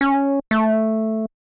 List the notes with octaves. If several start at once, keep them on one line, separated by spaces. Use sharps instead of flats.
C#4
A3